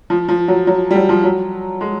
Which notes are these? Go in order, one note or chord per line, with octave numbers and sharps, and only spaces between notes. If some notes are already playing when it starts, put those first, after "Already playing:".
F3
F3
F#3
F#3
G3
F#3
F3
F#3
G#3